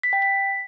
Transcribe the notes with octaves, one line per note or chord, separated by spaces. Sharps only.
B6
G5
B6